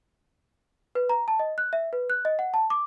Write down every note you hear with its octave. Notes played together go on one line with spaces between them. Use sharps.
B4
A#5
A5
D#5
F#6
E5
B4
F#6
D#5
F#5
A5
D6